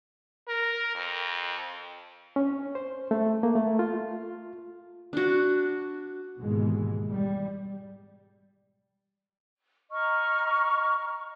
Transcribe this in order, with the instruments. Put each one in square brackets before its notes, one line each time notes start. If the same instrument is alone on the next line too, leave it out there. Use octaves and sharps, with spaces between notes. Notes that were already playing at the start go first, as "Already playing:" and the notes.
[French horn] A#4
F2
[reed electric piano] C#4
C5
A3
A#3
A3
F4
[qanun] D4 F#4
[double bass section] D#2 G#2 B2 E3 G#3
G3
[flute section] D#5 A#5 C#6 F6